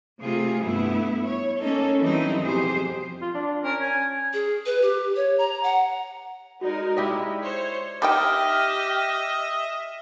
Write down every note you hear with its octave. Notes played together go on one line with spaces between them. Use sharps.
C3 A3 F4 G#4
G2 A3 B3 E4
C#5
A#3 C#4 D#4 A4
E3 F#3 G3 C4 D#4 E4
F2 B2 G4 G#4 C5
F4
D4
C#4 A#4
G#5
G#4
B4
G4
C#5
A#5
F#5
G#3 D#4 F#4 A#4 D5
G#3 E4 G4 D5 D#5
C5 C#5
G3 D#4 G4 D#5 E5 G5 F6